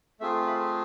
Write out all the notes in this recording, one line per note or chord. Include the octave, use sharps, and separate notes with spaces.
A3 C4 F4 G#4 E5
B5